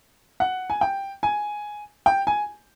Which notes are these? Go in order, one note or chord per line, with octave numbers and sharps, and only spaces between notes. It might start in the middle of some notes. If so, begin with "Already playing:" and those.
F#5
G#5
G5
G#5
G5
G#5